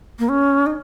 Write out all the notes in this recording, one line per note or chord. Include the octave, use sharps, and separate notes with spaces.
A#3
C#4
D#4